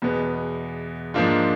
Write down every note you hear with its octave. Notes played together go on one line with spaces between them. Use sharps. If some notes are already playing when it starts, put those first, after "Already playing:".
E2 B2 G#3 B3
G#2 F3 A#3 D4 F4